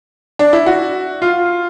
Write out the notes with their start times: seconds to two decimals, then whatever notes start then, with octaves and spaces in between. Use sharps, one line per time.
0.39 D4
0.53 E4
0.66 F#4
1.22 F4